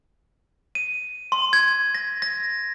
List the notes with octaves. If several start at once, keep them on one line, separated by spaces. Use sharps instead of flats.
D#7
C6
G#6
A#6
A#6